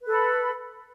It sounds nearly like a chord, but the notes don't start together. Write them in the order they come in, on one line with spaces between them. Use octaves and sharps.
B4 A4 B5